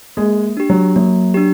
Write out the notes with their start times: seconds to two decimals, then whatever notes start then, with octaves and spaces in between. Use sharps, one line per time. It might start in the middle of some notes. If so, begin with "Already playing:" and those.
0.17 G#3 A#3
0.57 D4 G4
0.70 F#3
0.96 F#3 A#3
1.34 D4 G4